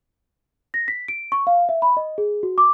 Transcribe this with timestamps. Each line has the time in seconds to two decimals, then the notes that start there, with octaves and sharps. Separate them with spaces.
0.74 A#6
0.88 B6
1.08 D7
1.32 C#6
1.47 F5
1.69 E5
1.82 B5
1.97 D#5
2.18 G#4
2.43 F#4
2.58 D6